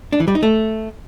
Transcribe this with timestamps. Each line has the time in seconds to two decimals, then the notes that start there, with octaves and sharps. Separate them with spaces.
0.13 D4
0.20 E3
0.28 G3
0.35 D#4
0.43 A3